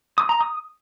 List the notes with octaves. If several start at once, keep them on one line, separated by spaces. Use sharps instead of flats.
D#6
A#5
D#6